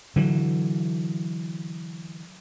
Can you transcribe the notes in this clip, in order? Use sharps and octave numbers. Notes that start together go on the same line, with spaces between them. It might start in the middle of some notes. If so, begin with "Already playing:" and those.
D3 E3 F#3